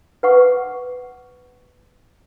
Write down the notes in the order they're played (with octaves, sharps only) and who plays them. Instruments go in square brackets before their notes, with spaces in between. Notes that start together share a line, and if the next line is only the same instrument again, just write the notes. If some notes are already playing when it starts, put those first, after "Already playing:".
[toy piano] B4 F#5 C#6 D6